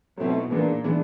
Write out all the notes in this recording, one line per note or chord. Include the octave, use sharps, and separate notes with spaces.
B2 F#3 A3 C4 E4
A#2 E3 G#3 B3 D4
E3 G#3 B3 D4